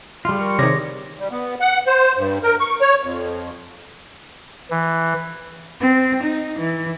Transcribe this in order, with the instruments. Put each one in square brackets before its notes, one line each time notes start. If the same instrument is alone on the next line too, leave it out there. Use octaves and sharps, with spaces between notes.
[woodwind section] C#3 [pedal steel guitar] G3 F4
[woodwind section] A#4 C#6
[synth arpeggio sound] C3 D#3 [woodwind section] G#4 C#5 D5 [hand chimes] D6 A#6
[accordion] G3
B3
F#5
C5
G2
A#4
C#6
C#5
F2
[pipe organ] E3
[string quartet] C4
D#4
E3